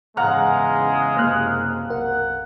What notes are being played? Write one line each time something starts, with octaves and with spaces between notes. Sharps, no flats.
E2 G#2 C#3 G#3 F5 F#5 A#5
F#1 C3 A#3 F6 F#6
B1 A#4 F#5